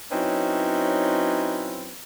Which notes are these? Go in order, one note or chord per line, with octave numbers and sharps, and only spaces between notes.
F#3 C4 C#4 D#4 E4 B4